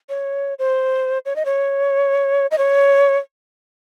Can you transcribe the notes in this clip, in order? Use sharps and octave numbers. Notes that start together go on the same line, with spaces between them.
C#5
C5
C#5
D#5
C#5
D#5
C#5